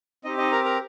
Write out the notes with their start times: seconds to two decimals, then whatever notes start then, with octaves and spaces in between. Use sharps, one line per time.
0.25 C4 D#4 G4 D#5
0.38 D#4 D#5
0.52 A#4 A#5
0.64 A#4 A#5